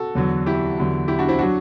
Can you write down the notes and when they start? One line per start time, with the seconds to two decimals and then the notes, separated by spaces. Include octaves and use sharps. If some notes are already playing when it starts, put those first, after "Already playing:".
Already playing: F#4 A4
0.15 E2 D3 F#3
0.46 E4 G4
0.78 E2 D3 F#3
1.08 E4 G4
1.19 D4 F#4
1.28 C4 E4
1.39 F#3 D4 F#4